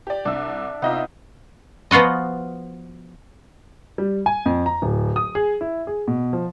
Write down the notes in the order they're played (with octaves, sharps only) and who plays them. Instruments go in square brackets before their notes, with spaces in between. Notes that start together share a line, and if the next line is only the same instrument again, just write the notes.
[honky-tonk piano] G4 D5
[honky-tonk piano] C2 E6 [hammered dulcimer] D4 E5
[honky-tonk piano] C3 D#5 E5 [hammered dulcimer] B3 D#4 F4
[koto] F3 B3 F4 F#4 D#5
[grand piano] G3
G#5
F2
A#5
D1
D#6
G#4
E4
G#4
B2
F3